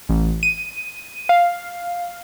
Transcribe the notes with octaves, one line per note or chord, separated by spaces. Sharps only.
A1
D#7
F5